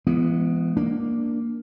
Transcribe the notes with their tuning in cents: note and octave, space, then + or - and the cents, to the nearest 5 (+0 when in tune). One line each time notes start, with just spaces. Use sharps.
E3 +40 G#3 +0 B3 +0
A#3 +0 D4 +0